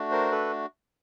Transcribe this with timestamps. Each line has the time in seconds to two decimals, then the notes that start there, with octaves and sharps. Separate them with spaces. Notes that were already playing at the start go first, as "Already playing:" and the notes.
Already playing: A3 D4 F#4
0.11 A#4 C5
0.31 A4 B4